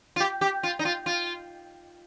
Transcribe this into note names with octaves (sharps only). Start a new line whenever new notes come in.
F4
G4
G4
F4
D#4
F4
F4